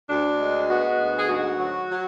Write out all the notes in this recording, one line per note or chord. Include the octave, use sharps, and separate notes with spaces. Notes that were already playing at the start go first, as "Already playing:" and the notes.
D2 D4
G#3
B3 F#4
D2
G#4
G#2 F#4
F#3
F#3